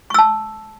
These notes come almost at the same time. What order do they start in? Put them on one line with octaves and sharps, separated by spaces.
C#6 E6 A5